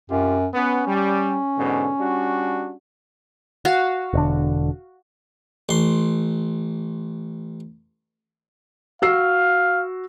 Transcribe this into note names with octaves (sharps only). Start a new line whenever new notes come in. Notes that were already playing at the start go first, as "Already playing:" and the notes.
C2 F#2 F4 G4
B3 C#4
G3
G#2 B2 D3
G3 D4 F#4
F#4 F5
E1 D3
A1 C6
F#4 F5 E6 C7